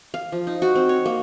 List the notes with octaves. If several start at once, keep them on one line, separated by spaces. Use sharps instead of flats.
F5
F3
D#4
F#4
C4
C#5
A#3